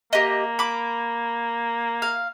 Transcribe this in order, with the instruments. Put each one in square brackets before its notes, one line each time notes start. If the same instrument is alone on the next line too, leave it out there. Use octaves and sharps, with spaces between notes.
[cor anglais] A#3 [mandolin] G4 D#5
[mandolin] B5 D6
F5